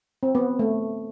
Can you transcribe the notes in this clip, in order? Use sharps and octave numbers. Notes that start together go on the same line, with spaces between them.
C4
B3
A3